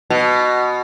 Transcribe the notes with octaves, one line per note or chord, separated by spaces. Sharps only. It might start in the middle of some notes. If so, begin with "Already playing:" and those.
B2